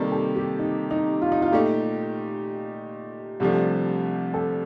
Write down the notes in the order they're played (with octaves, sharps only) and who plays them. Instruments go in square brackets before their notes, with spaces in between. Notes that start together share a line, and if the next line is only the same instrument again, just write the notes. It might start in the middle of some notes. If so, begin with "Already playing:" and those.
Already playing: [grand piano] C3 D#3 G3 A#3 [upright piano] D#4 G4 A4
[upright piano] A4
G4
D#4
D#4
F4
D#4
F4
[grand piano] A#2 A3 D#4 [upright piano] G4
[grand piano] C2 C3 F3 A3 D4
[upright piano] A4